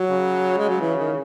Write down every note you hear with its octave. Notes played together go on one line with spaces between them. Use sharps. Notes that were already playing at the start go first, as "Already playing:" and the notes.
Already playing: F#3
C#3
G#3
F#3
E3
D#3